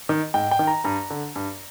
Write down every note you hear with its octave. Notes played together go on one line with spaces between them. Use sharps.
D#3
G#2 G5
G5
D#3
A#5
G2 A#5
D3
G2